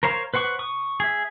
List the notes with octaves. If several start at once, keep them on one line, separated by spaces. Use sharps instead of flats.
A#4 C5 C#5 F5
B4 C5 F#5 C#6 D6
C#6 D#6
G#4 E5